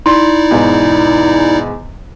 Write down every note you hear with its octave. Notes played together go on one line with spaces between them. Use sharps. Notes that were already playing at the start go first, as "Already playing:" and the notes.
D#4 E4 D5 C6
E2 G#2 B2